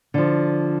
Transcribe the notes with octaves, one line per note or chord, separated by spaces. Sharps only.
D3 F3